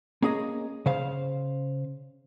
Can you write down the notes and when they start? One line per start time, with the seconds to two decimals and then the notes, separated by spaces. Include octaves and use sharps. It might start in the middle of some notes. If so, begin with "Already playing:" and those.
0.22 A#3 C#4 G#4 D#5 A#5
0.86 C#3 C5 F5